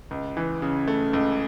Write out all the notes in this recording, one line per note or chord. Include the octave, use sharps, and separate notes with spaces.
C#2
E3
C#3
A3
C#2